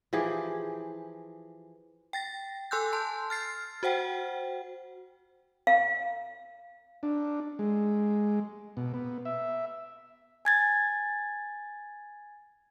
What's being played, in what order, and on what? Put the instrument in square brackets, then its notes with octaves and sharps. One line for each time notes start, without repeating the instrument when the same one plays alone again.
[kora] E3 F3 G4 G#4
[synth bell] G5 A6 A#6
A4 G#5 C6 E6 F#6 G6
A5 C6
F6 A6 C7
F#4 C5 F#5 G5
[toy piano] F5
[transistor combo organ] D4
G#3
B2
B3
E5
[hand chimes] G#5 G#6 A6